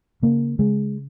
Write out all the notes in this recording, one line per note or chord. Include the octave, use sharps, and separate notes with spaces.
C#3 A#3
C#3 G#3